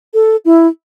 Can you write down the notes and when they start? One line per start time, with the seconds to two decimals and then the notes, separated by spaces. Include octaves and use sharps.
0.14 A4
0.45 E4